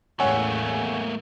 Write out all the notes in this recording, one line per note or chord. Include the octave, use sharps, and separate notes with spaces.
A1 E2 A2 A3 A#3 C#5 F#5 G#5